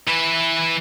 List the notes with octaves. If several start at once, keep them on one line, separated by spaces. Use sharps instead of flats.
E3 B4